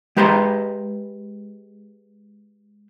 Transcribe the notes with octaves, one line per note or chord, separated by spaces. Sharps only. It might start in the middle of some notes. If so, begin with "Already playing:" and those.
G#3 G4 B4 A#5 C6